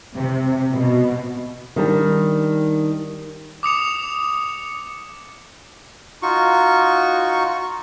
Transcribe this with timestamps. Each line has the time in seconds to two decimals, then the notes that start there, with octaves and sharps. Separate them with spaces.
0.15 C3
0.74 B2
1.76 D#3 G3 D4
3.63 D6 D#6 C#7 F7
6.22 D#4 F4 F#4 C#6